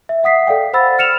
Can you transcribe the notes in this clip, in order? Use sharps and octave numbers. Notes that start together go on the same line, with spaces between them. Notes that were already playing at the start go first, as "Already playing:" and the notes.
E5
E5 F#5 D#6 B6 C7
A4 D5 F5 G5
C5 F#5 B5 E6 A6
F6 C#7 E7 F7